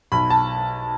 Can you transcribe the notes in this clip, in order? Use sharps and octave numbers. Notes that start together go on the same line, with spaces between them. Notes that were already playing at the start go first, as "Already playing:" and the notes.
B1 B5
A5